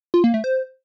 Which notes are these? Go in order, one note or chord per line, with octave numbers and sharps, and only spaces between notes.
F4
A#3
A3
C5